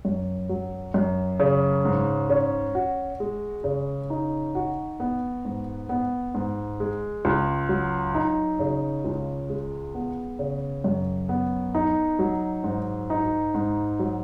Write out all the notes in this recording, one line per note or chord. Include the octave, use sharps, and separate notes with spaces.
F#2
F#3
F#2
C#3
G#2
C#4
F#4
G#3
C#3
D#4
F#4
B3
G#2
B3
G#2
G#3
C#2
F#3
D#4
C#3
C#2
G#3
B3
C#3
F#2
B3
D#4
F#3
G#2
D#4
G#2
F#3